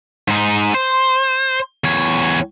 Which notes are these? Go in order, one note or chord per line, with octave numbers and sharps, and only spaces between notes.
G#2 D#4
C5
E2 C#5